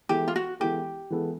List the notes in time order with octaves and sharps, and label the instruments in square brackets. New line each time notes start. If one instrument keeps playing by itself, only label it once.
[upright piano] E3 G#3 B3 E4 A4 [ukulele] G4
[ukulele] F4
F#4
[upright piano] E3 G#3 B3 E4 A4 [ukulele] G4
[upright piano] E3 G#3 B3 E4 A4